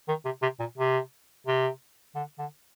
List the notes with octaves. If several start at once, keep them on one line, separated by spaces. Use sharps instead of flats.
D#3
C3
C3
A#2
C3
C3
D3
D3